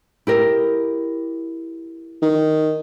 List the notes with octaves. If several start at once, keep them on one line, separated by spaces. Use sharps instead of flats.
E4 G4 A#4
D#3